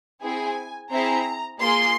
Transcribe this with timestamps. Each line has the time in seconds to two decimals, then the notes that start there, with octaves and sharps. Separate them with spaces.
0.22 C4 E4 G#4 G#5
0.91 C4 E4 G#4 A#5
1.60 A#3 F4 G#4 C6